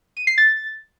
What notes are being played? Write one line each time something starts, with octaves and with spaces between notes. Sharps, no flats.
D#7
C7
A6